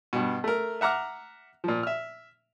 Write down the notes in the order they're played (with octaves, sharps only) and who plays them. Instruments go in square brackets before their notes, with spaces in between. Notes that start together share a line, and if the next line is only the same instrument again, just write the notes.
[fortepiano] G2 B2
A3 A#4
E5 F#5 A#5 D6 F6
A#2 F3
E5 F6